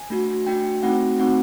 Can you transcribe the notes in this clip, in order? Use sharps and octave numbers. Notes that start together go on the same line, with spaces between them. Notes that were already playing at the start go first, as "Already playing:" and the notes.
Already playing: G#5
A3 D4 F#4
A3 D4 F#4 G5
A3 C4 D#4 F#4 F#5
A3 C4 D#4 F#4 F#5